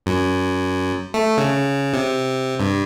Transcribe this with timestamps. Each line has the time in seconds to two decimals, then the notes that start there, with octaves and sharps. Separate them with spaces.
0.06 F#2
1.14 A3
1.38 C#3
1.93 C3
2.60 G2